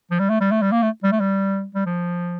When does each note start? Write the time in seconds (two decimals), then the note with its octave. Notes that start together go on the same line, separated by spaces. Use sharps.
0.11 F3
0.19 G3
0.30 A3
0.41 G3
0.51 A3
0.62 G3
0.72 A#3
0.82 A3
1.03 G3
1.12 A3
1.20 G3
1.75 G3
1.86 F3